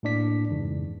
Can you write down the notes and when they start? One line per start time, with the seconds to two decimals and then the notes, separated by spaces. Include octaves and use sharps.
0.03 A2 A#3 D4 D5 B6
0.50 F2 G#2 C#3 E3